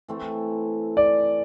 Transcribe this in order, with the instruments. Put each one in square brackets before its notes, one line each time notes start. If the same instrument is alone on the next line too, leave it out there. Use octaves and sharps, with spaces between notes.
[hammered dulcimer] E3 A3 C4 E4
[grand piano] D5